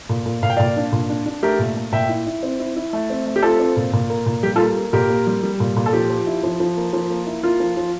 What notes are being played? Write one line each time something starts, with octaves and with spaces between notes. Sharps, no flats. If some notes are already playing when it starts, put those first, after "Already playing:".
A#2
A#2
A#2 F5
G5
A#2 D5 F5
D4
A#2
D4
D4
A3 G4 A#4
A#2
A3
A#2 E5 G5
E4
E4
C4
E4
E4
A3
C4
A3
G4
C4 F4 A4
C4
A#2
A#2
A#3
A#2
G3 G4
F4 A4
A#3
A#3
A#2 G4 A#4
A#3
G3
G3
A#2
A#2
A4
F3 G4
F3
E4
F3
F3
A#3
F3
A#3
E4
A#3 F4
F3
F3